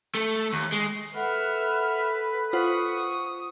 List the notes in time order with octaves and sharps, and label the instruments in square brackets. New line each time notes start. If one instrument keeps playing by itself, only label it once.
[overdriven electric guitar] A3
D#2
G#3
[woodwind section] A4 B4 [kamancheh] E5 F6 [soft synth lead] F#5
[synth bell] F4 C5 F#5 [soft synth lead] C#6 [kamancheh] D#6